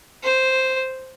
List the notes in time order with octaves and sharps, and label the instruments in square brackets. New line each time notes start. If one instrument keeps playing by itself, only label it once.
[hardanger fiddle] C5